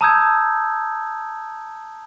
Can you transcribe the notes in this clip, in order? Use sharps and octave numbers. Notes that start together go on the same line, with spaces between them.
A5 A#5 D#6 E6 G6 G#6